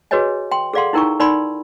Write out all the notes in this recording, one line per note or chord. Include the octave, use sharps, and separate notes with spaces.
F#4 G#4 B4 C#5 D#5 G#5
G5 C6
G#4 A4 D5 F5 F#5 C6
D#4 E4 A#4 G5 A#5 C#6
D#4 A#4 D5 G5 B5 C6